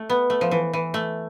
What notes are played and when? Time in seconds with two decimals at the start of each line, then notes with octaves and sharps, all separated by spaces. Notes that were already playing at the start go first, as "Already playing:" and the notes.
Already playing: A3
0.10 B3
0.30 A3
0.41 F3
0.51 E3
0.73 E3
0.94 A3